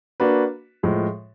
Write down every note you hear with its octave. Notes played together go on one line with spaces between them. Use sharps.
A#3 D4 F#4 B4
A2 F3 G#3